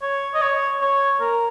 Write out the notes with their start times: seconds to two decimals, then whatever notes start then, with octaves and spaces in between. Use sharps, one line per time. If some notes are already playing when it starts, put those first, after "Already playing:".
0.02 C#5
0.34 D#5
0.42 C#5
0.81 C#5
1.20 A#4